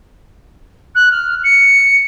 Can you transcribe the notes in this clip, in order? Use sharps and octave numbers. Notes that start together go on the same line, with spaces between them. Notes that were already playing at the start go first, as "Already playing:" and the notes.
F#6
F6
C#7